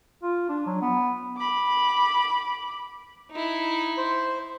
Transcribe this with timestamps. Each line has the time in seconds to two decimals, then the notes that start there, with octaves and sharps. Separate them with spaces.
0.23 F4
0.49 D4
0.66 F#3
0.82 B3
1.38 B5 D6
3.32 D#4 E4
3.97 C5